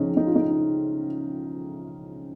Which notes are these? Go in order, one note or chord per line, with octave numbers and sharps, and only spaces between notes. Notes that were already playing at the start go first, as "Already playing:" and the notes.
Already playing: C#2 C#3 F3 C#4 D#4
D#4
F4
D#4